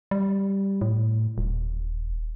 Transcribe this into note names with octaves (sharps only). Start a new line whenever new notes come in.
G3
A2
D#1